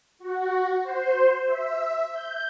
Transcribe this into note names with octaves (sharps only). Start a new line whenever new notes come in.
F#4
C5
E5
G6